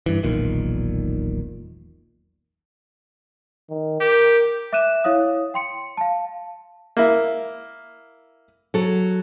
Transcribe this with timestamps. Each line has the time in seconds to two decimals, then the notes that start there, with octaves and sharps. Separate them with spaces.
0.06 G2 E3
0.23 E1 B1 A#2 D#3
3.70 D#3
4.01 G4 A#4
4.73 E5 D6 F#6 D#7 E7
5.04 E4 C#5 F5 D#6
5.54 G5 C6 C#7
5.97 F5 A5
6.97 A#3 E4
8.74 F#3 A4